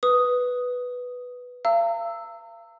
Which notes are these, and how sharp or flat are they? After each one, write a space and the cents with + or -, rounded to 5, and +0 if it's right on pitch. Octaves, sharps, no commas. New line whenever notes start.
B4 +0 D#6 +0
F5 -40 A#5 -35 E6 +0